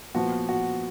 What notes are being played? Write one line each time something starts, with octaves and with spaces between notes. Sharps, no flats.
A#2 F3 B3 F#4
F#4